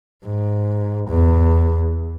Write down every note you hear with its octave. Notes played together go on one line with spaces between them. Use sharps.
G#2
E2